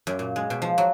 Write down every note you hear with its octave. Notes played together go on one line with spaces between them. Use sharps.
F#2
A#2
G#3
B2
F3
F#3